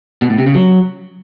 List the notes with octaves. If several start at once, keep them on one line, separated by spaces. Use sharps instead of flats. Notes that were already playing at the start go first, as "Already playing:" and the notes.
B2
A2
C3
C#3
F#3